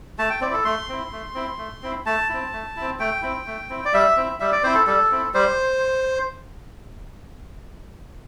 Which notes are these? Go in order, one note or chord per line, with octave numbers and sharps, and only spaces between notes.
A3 A5
G5
C4 E4 D5
A4
A3 C6
C4 E4
A3
C4 E4
A3
C4 E4
A3 A5
C4 E4
A3
C4 E4
A3 G5
C4 E4
A3
C4 E4
D5
G3 E5
C4 E4
G3 E5
D5
C4 E4 C5
A4
G3 A4
C4 E4
G3 C5